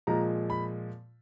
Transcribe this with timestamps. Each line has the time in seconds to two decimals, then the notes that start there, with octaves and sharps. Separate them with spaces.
0.07 A#2 F3 G#3 A#5
0.50 B5